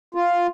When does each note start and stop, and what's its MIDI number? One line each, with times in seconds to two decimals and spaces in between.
0.15 0.47 65